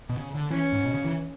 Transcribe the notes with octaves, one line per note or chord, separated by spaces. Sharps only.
B2
C#3
D3
E3 C#4
G#2
B2
C#3
E3